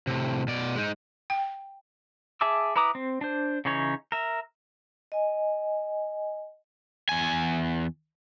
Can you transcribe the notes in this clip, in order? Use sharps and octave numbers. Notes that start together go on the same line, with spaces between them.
A2 C3
B2 D5
G#3 D#4
G5
G#4 E5 A5 D6 E6
E4 B4 A#5 D6 D#6
C4
D4 C5
C#3 E3 C#4 D#4 C#5
A#4 E5
D#5 G#5
E2 G#5